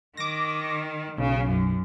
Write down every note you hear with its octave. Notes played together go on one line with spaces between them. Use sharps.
D#3 D6 A#6
B1 C#3
F#2